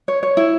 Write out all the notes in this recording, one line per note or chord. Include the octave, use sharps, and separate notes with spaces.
C#5
C#5
E4